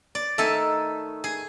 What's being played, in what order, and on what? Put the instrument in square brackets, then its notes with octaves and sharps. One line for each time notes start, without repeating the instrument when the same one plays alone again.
[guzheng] D5
[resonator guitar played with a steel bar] D#3 A3 D#4 [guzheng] A4 E5 G#5
[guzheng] G#4